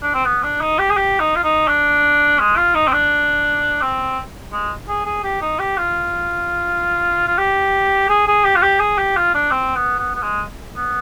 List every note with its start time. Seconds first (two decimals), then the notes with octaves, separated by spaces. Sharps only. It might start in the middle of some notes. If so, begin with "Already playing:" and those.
0.03 D4
0.14 C4
0.25 B3
0.43 D4
0.61 D#4
0.79 G4
0.91 G#4
0.97 G4
1.20 D#4
1.35 F4
1.44 D#4
1.68 D4
2.39 G#3
2.57 F4
2.75 D#4
2.88 C4
2.93 D4
3.82 C4
4.52 G#3
4.88 G#4
5.06 G#4
5.24 G4
5.42 D#4
5.59 G4
5.78 F4
7.27 F4
7.38 G4
8.10 G#4
8.28 G#4
8.45 G4
8.56 F4
8.62 G4
8.80 G#4
8.98 G4
9.17 F4
9.34 D4
9.51 C4
9.76 B3
9.99 B3
10.15 B3
10.22 G#3
10.77 B3